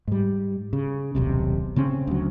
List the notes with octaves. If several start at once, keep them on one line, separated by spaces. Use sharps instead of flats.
G#2 G3
C#3
D#1 B1 C3
C#3 C4 C#4
D2 F#3